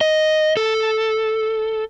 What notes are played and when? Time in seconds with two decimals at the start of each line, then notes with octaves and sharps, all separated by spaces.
0.01 D#5
0.57 A4